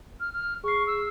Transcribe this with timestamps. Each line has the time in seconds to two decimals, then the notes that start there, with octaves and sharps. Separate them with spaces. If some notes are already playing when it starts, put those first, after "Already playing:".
0.20 F6
0.33 F6
0.64 G#4 C#6 C7
0.87 E6